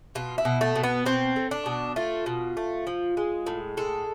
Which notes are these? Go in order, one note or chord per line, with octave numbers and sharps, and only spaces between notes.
B2 F4
E4
B2
A3
B2
B3
B2 C4
A3
D4
B2
A3 F4
B2
A3
F3
G#3
A2
G#3 A4